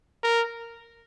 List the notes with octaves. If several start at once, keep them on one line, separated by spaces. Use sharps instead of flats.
A#4